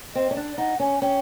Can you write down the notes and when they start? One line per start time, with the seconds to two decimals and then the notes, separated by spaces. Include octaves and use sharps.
0.14 C4 D#5
0.31 C#4
0.37 D4
0.58 D#4 F#5
0.80 C#4 G#5
1.02 C#4 G5